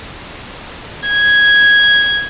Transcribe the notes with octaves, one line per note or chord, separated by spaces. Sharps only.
G#6